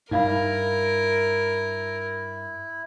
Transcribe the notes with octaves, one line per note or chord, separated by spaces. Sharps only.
G2 D#4 E4 A#4 F5 B5